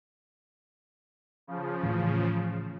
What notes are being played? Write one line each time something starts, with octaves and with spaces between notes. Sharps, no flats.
C#3 F3
A2 E3